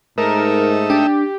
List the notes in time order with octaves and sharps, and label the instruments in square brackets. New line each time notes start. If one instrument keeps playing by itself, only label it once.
[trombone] G#2 [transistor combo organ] A3 D#4 E5 [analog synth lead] A#4
[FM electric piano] D4 [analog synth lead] G4